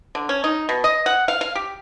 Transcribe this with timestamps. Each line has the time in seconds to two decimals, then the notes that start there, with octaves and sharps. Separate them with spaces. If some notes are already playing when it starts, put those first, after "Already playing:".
0.15 D3
0.29 C#4
0.44 D#4
0.69 B2
0.84 D#5
1.06 F#5
1.28 F5
1.41 F5
1.55 G4